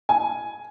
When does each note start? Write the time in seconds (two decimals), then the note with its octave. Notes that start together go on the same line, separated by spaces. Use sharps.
0.09 G#5